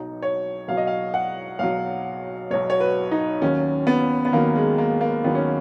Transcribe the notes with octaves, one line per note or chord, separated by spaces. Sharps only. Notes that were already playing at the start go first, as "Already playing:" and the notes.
Already playing: B1 B2 F#3 D#4
C#5
B1 B2 F#3 F5
D#5
F5
F#5
B1 B2 F#3 F5
B1 B2 F#3 C#5
C#5
B4
D#4
D#2 D#3 F#3 C#4
B3
B3
D#2 D#3 F#3 A#3
G#3
A#3
A#3
D#2 D#3 F#3 B3
C#4